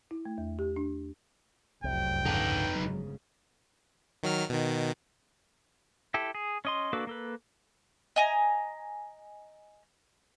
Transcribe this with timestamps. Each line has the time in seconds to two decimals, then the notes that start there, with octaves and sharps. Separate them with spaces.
0.11 E4
0.25 A3
0.38 E2
0.59 G4
0.76 D4
1.84 F1 C2 F#2 F#3 G5
2.25 C#2 G#2 D3 D#4 B4
2.75 G1 G#2 C#3 F#3
4.23 D#3 F#3 F6
4.50 B2 D#3
6.14 E4 G4 A4
6.35 G#4
6.65 C#4 D#5 C6
6.93 A#3 D4 F#4 A4 B4
7.07 A#3 A4 B4
8.16 D#5 G#5 A#5